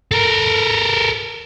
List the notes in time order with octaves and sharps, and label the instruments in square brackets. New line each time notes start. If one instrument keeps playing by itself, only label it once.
[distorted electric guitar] A4 A#4